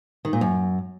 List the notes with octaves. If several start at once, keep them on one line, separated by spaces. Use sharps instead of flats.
D#3
A#2
F#2